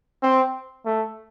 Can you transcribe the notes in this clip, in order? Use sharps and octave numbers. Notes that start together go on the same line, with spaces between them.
C4
A3